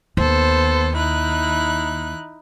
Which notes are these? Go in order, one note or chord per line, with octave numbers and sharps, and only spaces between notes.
D#2 B3 A4 C5
D#4 E4 F#6